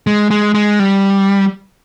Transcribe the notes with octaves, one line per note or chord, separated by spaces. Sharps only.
G#3
G#3
G#3
G3